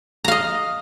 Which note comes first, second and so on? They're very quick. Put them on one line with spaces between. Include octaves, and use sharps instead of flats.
A#5 F5 D#5